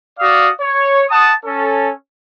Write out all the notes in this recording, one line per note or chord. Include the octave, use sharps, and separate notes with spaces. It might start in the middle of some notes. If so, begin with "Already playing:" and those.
F#4 D5 F5 D#6
C#5
F#5 A5 D#6
C#4 A4